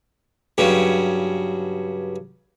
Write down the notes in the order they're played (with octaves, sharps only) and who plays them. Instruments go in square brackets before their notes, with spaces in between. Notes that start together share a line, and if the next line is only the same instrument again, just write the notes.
[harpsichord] G2 C#3 F#3